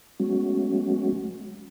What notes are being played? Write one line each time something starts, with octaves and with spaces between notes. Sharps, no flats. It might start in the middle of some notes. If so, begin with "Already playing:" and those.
F#3 G#3 A3 B3 C#4 F#4